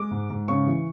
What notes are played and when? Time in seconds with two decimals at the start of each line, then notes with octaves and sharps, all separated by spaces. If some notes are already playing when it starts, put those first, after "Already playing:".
Already playing: G#3 D6
0.11 G#2
0.30 G#2
0.48 C#3 C#6
0.67 E3